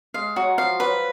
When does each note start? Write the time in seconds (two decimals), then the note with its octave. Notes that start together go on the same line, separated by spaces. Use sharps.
0.14 G#3 F5
0.36 F#3 F#4
0.58 F3 F5
0.80 F#3 B4